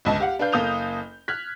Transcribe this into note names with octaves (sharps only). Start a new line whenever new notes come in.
G1 C#2 A5
G4 F5 F#5
D4 B4 F5 G6
F#1 A#3 A4 D#6 G6 F7
F6 F#6 G#6 B6